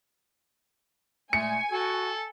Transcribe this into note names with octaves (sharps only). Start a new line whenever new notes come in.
A#2 G#3 A3 G#5 C#7
F#4 A4